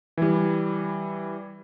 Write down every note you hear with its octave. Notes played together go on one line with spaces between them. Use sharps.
E3 G3